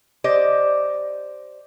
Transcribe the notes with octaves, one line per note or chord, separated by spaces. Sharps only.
G4 C5 D5 D#5